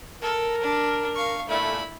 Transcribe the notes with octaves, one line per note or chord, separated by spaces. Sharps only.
A4 A#4
D4
F5 C#6
A#2 A3 E4 B5